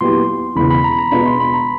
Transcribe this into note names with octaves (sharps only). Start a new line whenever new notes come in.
A#2 F#3 B3 E4 G4 C6
E1 E2 C#3 B5
B5
A#5
B5
A#5
B2 G#3 B3 D4 F4 B5
C6
B5
A#5